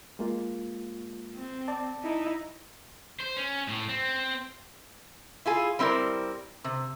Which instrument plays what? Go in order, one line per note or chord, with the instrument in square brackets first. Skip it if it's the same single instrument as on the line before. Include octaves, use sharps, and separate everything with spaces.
[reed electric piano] G#3 A#3 F4
[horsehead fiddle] C4
[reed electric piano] D5 A5
[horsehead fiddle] D#4 E4
[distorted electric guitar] C5
C#4
A2
C4
[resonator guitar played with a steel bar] E4 F4 G#4
G3 C4 E4 F#4 A#4 D5
C3